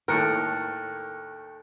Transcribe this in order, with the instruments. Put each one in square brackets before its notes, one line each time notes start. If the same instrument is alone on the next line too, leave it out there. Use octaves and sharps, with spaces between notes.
[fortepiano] D#2 A2 [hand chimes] A4 G5 [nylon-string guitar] A#4 [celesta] F6 F#6 C#7